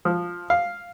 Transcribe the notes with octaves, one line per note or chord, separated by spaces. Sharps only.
F3
F5